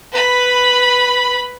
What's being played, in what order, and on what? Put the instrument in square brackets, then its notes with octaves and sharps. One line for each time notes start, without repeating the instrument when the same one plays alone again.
[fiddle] B4 B5